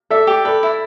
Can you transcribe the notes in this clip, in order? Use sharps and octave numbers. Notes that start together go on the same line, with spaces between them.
A4 D5 E5
G4
A4 B4 D5
E4